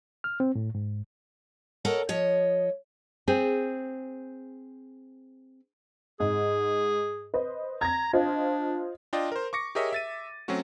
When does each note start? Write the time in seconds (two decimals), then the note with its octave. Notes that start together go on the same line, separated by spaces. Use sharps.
0.24 F6
0.40 C4
0.55 A2
0.75 G#2
1.85 A4 A#4 C#5 D#5 F#5 A5
2.09 F3 C#5 D#5
3.28 C4 G#4
6.20 G#2 G#4
7.34 B4 C5 D#5
7.81 A#5 G#6 A#6
8.13 D4 F4 C5 D#5
9.13 D4 F4 D5 D#5 G5
9.32 A#4 C5
9.53 C#6 D6 A#6 C#7
9.75 G4 G#4 A#4 C#5 D#5 E5
9.93 E5 A6 D#7
10.48 F#3 A3 C4 C#4 F#4